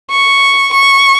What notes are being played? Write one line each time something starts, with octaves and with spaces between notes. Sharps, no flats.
C#6
C#6